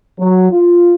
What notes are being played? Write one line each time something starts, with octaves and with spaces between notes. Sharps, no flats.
F#3
F4